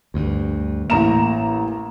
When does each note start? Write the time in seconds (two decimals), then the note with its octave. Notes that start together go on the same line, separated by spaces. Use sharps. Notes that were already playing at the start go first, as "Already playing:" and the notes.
0.14 D2 G2
0.90 A1 A#3 A#5 E7